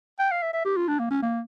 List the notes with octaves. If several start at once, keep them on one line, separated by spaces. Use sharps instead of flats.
G5
F5
E5
E5
G4
F4
D4
A#3
C#4
A#3